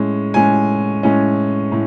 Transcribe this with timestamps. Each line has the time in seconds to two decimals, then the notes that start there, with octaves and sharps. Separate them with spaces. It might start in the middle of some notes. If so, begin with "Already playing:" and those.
Already playing: A2 G#3 C#4
0.34 A2 G#3 C#4 G#5
1.03 A2 G#3 C#4
1.72 A2